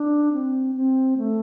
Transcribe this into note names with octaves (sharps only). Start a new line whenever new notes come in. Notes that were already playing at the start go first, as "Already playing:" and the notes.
Already playing: D4
C4
C4
A3